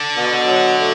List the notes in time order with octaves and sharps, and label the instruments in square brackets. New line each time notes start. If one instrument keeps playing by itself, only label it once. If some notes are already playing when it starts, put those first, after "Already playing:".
Already playing: [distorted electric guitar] D3
[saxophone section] B2
F#3
A3